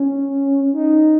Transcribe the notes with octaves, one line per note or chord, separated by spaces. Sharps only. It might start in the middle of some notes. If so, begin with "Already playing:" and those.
Already playing: C#4
D#4